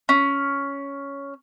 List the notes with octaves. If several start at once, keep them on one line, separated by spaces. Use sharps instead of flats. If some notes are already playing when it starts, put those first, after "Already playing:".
C#4